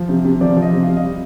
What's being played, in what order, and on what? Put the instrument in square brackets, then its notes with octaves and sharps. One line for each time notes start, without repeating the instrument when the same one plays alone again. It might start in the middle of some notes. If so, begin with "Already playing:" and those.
Already playing: [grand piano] F3
C3
C3
F3 D5
F3
D#5
C3
C3 F5
D#5
G3